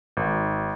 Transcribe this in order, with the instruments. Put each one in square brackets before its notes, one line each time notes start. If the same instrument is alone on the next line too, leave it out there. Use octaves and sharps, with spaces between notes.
[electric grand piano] G#1